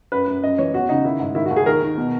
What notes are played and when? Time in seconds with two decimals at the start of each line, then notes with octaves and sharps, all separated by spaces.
0.12 F#2 B4
0.27 F#2
0.43 F#2 D#5
0.58 E3 C#5
0.74 E2 F#4
0.89 C#3 D#4
1.05 D#3 E4
1.20 G#2
1.35 D#3 E4
1.45 F#4
1.51 D#2
1.56 G#4
1.66 D#3 A#4
1.82 D#3
1.98 B2